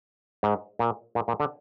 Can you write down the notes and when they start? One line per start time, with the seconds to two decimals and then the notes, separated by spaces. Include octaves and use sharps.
0.43 G#2
0.79 A#2
1.15 A#2
1.28 A#2
1.40 D3